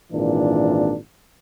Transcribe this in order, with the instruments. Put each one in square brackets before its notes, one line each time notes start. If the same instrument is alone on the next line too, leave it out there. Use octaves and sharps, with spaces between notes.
[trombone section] G#1 A#2 E3 D4